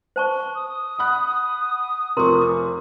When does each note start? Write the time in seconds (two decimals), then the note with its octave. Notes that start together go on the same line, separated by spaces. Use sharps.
0.16 C5 A5 C#6
0.55 D#6
0.99 F#5 B5 F#6
2.17 F1 F3 A#4 A#5 C6 C#6
2.42 D6